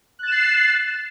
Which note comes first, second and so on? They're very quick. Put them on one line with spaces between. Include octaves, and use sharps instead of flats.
F#6 A6 E7 C7